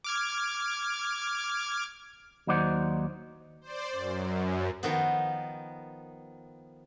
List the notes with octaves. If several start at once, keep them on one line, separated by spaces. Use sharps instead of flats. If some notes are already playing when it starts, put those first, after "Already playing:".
D6 F6 G#6
D#2 F#3 D#4 C5 D5 F#5
C5 D5
F#2
D#3 F3 B3